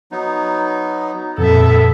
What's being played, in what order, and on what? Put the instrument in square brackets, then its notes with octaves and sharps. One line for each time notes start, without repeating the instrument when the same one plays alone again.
[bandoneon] F#3 B3 D#4
[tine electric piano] F2 A#2 [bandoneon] B3 [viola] A4 E5